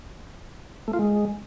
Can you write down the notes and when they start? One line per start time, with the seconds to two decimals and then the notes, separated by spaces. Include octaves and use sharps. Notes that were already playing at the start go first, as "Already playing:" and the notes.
0.88 A3
0.93 F4
0.99 G#3